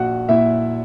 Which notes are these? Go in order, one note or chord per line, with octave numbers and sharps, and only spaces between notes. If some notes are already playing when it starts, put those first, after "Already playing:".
Already playing: A#1 F#4 F#5
A#2 E4 E5